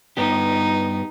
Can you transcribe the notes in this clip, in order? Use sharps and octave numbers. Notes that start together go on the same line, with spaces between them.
G2 B3 D#4 G4